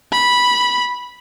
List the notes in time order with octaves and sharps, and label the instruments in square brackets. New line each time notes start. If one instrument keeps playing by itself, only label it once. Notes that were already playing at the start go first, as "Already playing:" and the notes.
[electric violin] B5